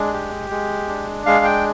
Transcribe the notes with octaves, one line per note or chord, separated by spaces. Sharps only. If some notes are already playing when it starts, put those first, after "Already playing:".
Already playing: G#3 D4
G4
G#3
D4
G#3 F5
G5